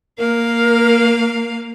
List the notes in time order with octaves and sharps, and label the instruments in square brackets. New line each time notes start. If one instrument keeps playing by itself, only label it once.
[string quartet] A#3 F5 [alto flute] A#4